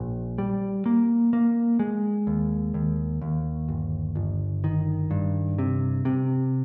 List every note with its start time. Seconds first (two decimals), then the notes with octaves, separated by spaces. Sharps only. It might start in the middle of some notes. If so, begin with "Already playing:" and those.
Already playing: A#1
0.38 G3
0.86 A#3
1.33 A#3
1.79 G#3
2.27 D#2
2.74 D#2
3.21 D#2
3.68 G1
4.15 G1
4.64 D#3
5.11 G2
5.58 C3
6.05 C3